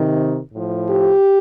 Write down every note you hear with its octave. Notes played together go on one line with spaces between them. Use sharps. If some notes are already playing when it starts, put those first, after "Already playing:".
Already playing: C3 D#3
A2
F3
G4